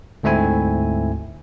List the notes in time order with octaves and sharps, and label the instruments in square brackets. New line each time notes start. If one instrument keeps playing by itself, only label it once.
[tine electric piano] D2 G#2 A3 C4 E4 G#5